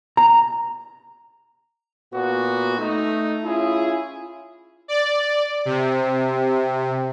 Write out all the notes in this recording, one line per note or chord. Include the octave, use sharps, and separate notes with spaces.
A#5
A#2 B3 F#4
A3 D#4
C#4 E4 F4 G#4
D5
C3